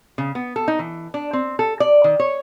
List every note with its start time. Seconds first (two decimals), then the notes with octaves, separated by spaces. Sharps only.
0.18 C#3
0.35 B3
0.56 A4
0.68 D#4
0.79 E3
1.14 D4
1.33 C4
1.59 A4
1.80 D5
2.04 D#3
2.20 C#5